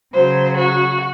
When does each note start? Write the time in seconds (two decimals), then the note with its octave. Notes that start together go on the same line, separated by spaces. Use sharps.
0.13 C#3 F#3 C5
0.57 F#4